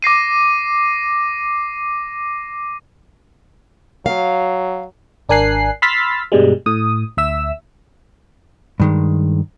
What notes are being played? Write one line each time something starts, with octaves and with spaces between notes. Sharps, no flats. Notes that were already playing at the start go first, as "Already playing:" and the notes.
D6 A#6 C7 D#7
F#3 F5
G#1 D4 A#4 G#5 F#6 C7
B5 C6 E6 F6 A6 B6
G2 B2 G3 G#3
A2 D#6
D2 E5 E6
G2 D#3 G#3